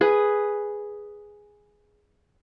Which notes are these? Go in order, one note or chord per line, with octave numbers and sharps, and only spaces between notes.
G#4 B4